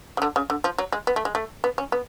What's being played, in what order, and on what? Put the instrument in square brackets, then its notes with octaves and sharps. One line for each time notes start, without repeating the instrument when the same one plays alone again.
[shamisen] C#3
D3
C#3
D3
F3
F#3
G#3
B3
A3
G#3
A3
B3
C#4
B3